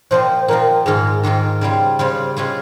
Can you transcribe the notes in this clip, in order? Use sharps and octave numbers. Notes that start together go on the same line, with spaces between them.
A#2 F3 C4 C5
A#2 F3 C4 A#4
G#2 D#3 A#3 F4 G#4
G#2 D#3 A#3 F4
C#3 G3 C4 F4
C#3 G3 C4 F4 C5
C#3 G#3 C#4 F4